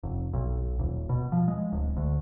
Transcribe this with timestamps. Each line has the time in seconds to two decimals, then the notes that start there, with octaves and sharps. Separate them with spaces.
0.04 F1
0.34 B1
0.79 D#1
1.09 B2
1.32 F3
1.48 G#3
1.73 D1
1.97 D2